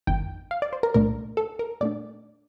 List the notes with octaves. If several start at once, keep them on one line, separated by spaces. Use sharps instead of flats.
G1 F2 D#3 G5
F5
D5
C5
A#4
C2 A#2 A3 D4 A#4
A4
A#4
A#2 A3 D4 D5